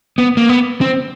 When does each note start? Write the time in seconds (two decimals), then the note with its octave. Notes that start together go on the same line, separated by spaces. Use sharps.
0.18 B3
0.37 A#3
0.49 B3
0.81 C4